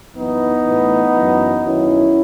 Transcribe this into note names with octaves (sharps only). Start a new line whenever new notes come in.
F#2 E3 B3 D#4
A2 E3
F#2 E3
F#2 D#3 F#3 C#4 E4